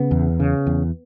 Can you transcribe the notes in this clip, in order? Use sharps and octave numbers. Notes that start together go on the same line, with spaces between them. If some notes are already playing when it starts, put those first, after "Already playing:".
Already playing: C#3 B3
E2
C#3
E2